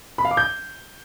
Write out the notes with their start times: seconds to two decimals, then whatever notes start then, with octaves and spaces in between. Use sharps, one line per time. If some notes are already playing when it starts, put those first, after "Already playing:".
0.18 B5
0.25 F5
0.31 D6
0.37 G6